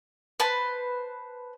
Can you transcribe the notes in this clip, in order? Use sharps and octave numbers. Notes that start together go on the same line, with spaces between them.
B4 C5 A5